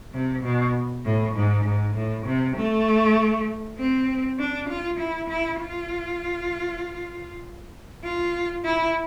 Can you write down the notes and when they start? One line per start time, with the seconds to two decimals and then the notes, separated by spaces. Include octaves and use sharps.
0.14 C3
0.43 B2
1.05 A2
1.35 G#2
1.65 G#2
1.95 A2
2.26 C3
2.57 A3
3.78 C4
4.38 D4
4.69 F4
5.00 E4
5.29 E4
5.60 F4
8.04 F4
8.65 E4